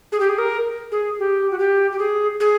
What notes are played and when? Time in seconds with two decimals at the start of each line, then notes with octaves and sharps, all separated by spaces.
0.12 G#4
0.20 G4
0.29 G#4
0.38 A#4
0.92 G#4
1.19 G4
1.51 F#4
1.59 G4
1.92 G4
1.99 G#4
2.40 G#4